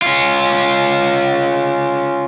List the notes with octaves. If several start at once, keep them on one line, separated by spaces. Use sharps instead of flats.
C#4 F4